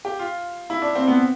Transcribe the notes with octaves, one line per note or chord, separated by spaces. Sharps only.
G4
F4
E4
D4
C4
B3